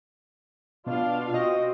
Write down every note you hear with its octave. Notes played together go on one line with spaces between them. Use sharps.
B2 D4 F4 F5
C4 F#4 D#5